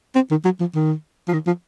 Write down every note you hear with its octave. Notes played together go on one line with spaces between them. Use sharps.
C4
D#3
F#3
F3
D#3
F3
D#3
F3